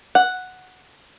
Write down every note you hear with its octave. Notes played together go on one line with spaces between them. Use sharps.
F#5